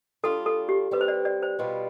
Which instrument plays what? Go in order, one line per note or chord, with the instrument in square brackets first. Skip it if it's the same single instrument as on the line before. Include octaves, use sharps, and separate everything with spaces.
[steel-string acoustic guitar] G3 D4 F4 [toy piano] A4
[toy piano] A4
G4
[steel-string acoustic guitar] G3 C4 G4 [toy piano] B4
[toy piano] C5
D5
D5
C5
[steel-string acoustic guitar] B2 G3 B3 F4